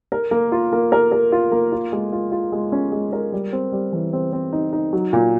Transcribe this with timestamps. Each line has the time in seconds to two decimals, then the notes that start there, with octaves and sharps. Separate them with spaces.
0.12 A#4
0.31 A#3
0.52 F4
0.72 A#3
0.92 A#4
1.12 A#4
1.32 F4
1.52 A#3
1.72 F4
1.92 G#3
2.12 F4
2.32 F4
2.52 G#3
2.72 C#4
2.92 G#3
3.13 A#4
3.32 G3
3.52 C4
3.72 G3
3.93 E3
4.13 C4
4.33 C4
4.52 D#4
4.73 D#4
4.93 F#3
5.13 A#2